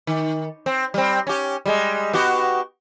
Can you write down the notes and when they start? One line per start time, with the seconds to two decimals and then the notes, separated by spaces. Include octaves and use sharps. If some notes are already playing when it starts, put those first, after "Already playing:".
0.07 D#3
0.66 C4
0.94 G3 C4
1.27 C#4 G4
1.66 G3 G#3
2.13 B3 F#4 G4